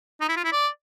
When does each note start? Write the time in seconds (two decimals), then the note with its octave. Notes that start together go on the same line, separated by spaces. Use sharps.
0.21 D#4
0.29 E4
0.37 F4
0.44 E4
0.52 D5